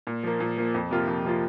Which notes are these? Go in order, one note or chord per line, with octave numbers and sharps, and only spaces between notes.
A#2
F3 A#3
A#2
F3 A#3
F2
C3 F3 A#3 F4
F2
C3 F3 A#3 F4